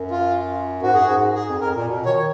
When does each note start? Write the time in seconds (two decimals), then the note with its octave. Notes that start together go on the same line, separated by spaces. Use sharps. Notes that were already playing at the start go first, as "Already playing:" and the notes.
Already playing: F#2
0.11 F4
0.82 G#2 F#4
0.92 F#2 G#4
1.03 G#2 F#4
1.35 G#4
1.49 F2
1.61 F2 A#4
1.75 A#2
1.88 B2
2.06 D#3 C#5